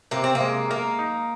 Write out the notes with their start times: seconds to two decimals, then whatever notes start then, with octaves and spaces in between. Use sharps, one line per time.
0.11 C3 A#3
0.24 C4
0.35 A#3
0.41 G#3
0.70 A#3 A#4
0.99 D#4